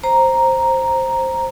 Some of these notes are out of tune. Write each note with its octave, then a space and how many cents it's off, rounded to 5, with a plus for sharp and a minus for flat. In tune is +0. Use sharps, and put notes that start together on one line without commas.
C5 +10 A#5 +0